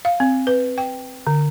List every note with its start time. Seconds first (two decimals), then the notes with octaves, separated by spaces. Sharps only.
0.05 F5
0.20 C4
0.47 B4
0.78 G5
1.27 D3